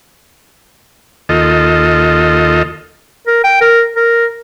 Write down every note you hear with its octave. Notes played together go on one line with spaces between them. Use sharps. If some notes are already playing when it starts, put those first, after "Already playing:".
D#2 F4 A4 D#5
A#4
G5
A#4
A#4